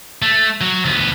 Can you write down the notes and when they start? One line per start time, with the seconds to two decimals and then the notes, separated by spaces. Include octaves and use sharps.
0.22 A3
0.61 F#3
0.85 D2 B3